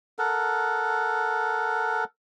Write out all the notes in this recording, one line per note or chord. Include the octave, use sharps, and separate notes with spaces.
A4 A#4 F#5